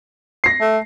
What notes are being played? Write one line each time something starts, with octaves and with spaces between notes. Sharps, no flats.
A#6 C7
A3